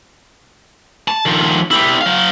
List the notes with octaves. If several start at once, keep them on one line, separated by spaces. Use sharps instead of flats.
A5
D#3 F3
E4 G4
F#3 F5